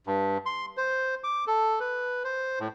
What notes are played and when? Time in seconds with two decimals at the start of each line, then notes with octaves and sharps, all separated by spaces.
0.07 G2
0.46 C6
0.77 C5
1.24 D6
1.47 A4
1.80 B4
2.24 C5
2.60 A2